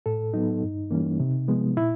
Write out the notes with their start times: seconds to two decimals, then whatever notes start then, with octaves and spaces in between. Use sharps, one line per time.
0.06 A2 A4
0.34 F#3 B3 D#4
0.63 G2
0.91 E3 G3 A#3 C#4
1.20 C3
1.48 F3 G#3 B3
1.77 A#2 E4